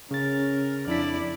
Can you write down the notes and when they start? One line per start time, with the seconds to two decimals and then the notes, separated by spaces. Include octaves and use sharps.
0.11 C#3 C#4 A#4 A6
0.87 F2 D4 E4 D5 B6